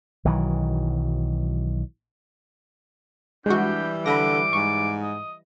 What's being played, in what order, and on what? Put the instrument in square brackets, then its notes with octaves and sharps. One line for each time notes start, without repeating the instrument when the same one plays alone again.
[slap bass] B1 D#3 E3 F#3
[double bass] E3 G3 [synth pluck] G#3 F#4 [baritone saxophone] D4 [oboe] G4
[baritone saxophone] D3 [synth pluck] B5 A#6 [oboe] D6
[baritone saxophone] G#2 [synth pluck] C#6
[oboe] D#5